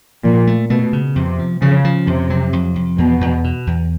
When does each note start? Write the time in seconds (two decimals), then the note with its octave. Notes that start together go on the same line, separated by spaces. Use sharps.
0.24 A#2 F3
0.47 A3
0.70 B2 A3
0.93 C#3
1.16 F2 C3
1.39 F3
1.62 C#3 F3
1.84 F3
2.07 F2 C3
2.30 F#3
2.53 F2
2.76 F2
2.98 E2 B2
3.21 E2
3.44 B2
3.67 E2